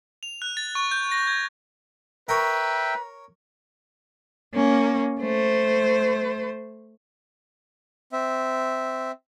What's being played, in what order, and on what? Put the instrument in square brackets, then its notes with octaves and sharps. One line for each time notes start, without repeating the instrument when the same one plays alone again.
[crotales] F7
F#6
A6
C#6
G6
A#6
G#6
[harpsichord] A#4 C#5 [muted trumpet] B4 [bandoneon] E5 G5 [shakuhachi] A#5
[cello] A#3 C#4
A3 C5
[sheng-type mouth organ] C4 E5